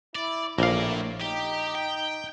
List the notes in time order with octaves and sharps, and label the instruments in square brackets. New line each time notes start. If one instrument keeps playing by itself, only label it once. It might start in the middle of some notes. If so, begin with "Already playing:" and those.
[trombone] E4 [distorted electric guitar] D5
[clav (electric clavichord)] A#1 F5 [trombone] A2 [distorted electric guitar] A#3 D5
[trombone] D#4 [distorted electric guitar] G4
[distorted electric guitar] G5